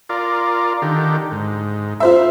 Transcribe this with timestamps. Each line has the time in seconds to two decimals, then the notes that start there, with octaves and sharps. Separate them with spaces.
0.09 F4 A#4 D5
0.82 D3 D#3 G4
1.32 G#2
2.00 F4 C5 E5